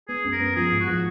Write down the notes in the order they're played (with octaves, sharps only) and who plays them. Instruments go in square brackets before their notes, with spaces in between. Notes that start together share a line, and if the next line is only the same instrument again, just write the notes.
[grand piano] B3 [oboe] G#4
[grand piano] F#2
[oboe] A#4
[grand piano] B3
[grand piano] F3 [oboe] G#4
[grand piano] G#2
[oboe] F#4
[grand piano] F3